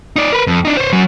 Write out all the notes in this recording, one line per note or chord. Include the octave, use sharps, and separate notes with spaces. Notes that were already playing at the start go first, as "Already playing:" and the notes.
D#4 D5
A#4 B4
F2
D4 D#4
C5 C#5
F#3 C#4